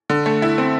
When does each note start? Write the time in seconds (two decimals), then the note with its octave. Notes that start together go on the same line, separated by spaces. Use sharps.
0.10 D3
0.26 A3
0.42 E4
0.58 C4